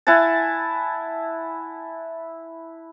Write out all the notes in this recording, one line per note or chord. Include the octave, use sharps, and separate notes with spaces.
E4 F#5 G#5 A5